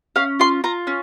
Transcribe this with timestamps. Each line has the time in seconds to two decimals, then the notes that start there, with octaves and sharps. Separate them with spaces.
0.16 C#4 F5
0.39 F4 C6
0.64 F4 A#5
0.87 C#4